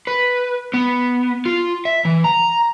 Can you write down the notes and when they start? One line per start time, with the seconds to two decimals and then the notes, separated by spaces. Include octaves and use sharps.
0.07 B4
0.74 B3
1.46 F4
1.85 E5
2.05 E3
2.24 A#5